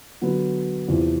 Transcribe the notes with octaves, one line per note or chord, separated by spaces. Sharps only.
D3 F#3 B3
E2 C3 F3